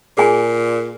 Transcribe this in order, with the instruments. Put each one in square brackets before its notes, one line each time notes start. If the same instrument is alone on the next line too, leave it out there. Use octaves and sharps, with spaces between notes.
[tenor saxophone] A#2 [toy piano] G#4 G#5